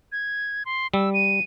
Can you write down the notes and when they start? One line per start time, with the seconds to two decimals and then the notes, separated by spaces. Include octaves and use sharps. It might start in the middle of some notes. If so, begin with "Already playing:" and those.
0.12 G#6
0.66 C6
0.94 G3 E6
1.14 D#7